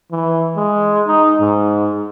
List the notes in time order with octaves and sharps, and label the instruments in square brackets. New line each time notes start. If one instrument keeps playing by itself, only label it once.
[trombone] E3
G#3
D#4
G#2